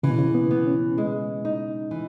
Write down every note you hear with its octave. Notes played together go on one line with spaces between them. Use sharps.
C#3 E3
B2
C#3
B3
B3
C#4
G#3
D#4
E3